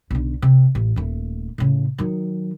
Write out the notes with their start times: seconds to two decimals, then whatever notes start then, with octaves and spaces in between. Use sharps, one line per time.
0.11 B1 D3
0.42 C3
0.75 A1
0.96 D#1 A3
1.58 A2 C#3
1.98 D#3 F#3